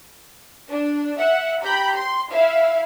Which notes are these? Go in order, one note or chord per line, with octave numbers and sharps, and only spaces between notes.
D4
E5 F#5
G4 A#5 B5 G6
C6
E4 E5 F5